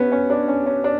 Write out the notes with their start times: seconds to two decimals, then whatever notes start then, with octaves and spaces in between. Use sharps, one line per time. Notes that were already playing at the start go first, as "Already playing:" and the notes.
Already playing: B3 C#4
0.12 C#4
0.30 D4
0.48 C#4
0.66 C#4
0.84 D4